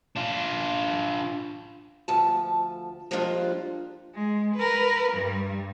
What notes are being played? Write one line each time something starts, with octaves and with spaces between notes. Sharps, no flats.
D4 F4
D2 F3 A5
F3 G3 G#3 A#3 D4 F4
G#3
A#4 B4
G2 G3